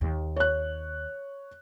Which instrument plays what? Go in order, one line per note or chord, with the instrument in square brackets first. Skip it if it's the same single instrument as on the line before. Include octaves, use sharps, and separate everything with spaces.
[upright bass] D#2 D#3
[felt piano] C#5 F#6